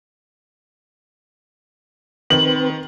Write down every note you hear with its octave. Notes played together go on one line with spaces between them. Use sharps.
D#3 C4 B4 F#7